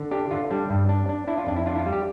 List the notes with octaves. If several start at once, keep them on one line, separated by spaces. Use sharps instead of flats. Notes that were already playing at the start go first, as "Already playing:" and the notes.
Already playing: D3
D4 G4
D3 F4
G3 D4
G2
D4
D4
D4 E4
F4
F2 D4
E4
D4 F4
E4
F4
G3
G4